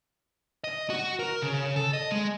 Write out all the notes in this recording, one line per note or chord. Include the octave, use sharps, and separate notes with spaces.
D#5
F#4
A#4
C#3
A4
D#5
G#3